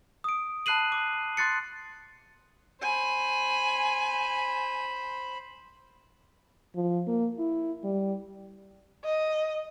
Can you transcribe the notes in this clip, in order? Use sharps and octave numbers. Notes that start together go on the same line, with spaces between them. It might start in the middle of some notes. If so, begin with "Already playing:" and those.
D#6 D7
A5 B5 F#6 C7 D#7 F#7
D6
C6 D6 F#6 A6 C7 C#7
C5 G#5 B5
F3
A#3
E4
G3
D#5